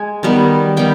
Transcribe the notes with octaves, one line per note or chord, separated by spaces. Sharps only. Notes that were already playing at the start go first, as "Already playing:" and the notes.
Already playing: G#3 G#5
D#3 G3 B3
D#3 G3 B3 G5